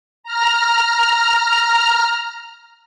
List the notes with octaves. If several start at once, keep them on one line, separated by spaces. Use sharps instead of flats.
A#5 F6